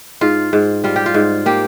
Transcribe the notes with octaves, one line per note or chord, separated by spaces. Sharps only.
G#2 F4
G#2
G3 F4
G4
F4
G#2
A#3 G4